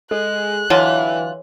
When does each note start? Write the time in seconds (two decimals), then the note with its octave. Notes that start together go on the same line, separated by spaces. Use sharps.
0.11 G#3 A4 F#6
0.70 D3 E3 F#3 F4 C#5 D#5 F5